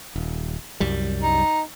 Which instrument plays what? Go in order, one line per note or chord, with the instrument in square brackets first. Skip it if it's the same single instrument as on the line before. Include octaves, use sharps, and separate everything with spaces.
[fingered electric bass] D#1
C2 F#2 G3
[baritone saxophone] D#4